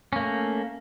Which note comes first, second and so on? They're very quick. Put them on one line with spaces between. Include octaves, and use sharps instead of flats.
C#4 A#3 A3